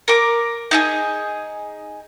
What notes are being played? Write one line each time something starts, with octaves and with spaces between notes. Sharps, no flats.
A#4 D6
D#4 E4 G#4